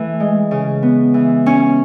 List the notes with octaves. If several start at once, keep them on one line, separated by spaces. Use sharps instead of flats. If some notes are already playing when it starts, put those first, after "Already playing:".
Already playing: E3 A3
G#3
C#3
B3
E3
C#4